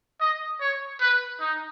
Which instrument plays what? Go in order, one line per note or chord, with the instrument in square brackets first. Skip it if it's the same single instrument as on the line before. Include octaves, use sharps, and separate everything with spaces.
[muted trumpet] D#5
C#5
B4
D#4